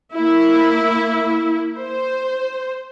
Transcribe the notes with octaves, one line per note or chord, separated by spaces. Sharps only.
A#3 E4
C5